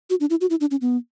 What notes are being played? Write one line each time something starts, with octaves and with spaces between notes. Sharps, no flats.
F#4
D4
E4
F#4
E4
D4
C#4
B3